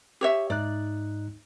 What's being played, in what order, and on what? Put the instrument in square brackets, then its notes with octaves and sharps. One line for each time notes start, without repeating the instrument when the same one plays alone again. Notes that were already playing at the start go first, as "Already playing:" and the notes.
[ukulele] G4 C#5 E5
[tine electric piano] G#2 D#4 F#6 [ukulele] D5